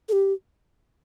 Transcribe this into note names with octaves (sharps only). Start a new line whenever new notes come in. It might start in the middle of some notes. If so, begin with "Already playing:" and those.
A4
G4